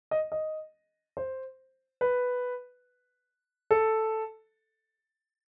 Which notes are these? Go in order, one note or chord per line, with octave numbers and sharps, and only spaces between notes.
D#5
D#5
C5
B4
A4